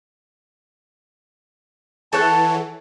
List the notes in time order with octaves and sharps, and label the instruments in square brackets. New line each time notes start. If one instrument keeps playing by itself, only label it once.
[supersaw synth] E3 [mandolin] A4 C#5 F#5 [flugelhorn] A5